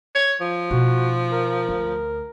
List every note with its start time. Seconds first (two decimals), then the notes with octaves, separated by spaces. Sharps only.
0.15 C#5
0.41 F3
0.71 B2 D#4 F#4
1.32 A#4
1.69 D2